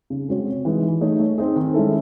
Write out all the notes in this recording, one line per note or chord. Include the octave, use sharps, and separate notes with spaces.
C#3
G#3 C4 F#4 C#5
C3
E3 G#3 D#4
E3
A3 D#4 G#4 C#5
A3
C4 D#4 G#4
D#3
G#3 C#4 E4 A4